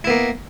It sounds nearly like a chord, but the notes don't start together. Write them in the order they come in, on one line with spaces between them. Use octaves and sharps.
E4 B3 A#3